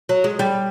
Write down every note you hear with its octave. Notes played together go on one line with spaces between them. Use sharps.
F#3
G#3
G3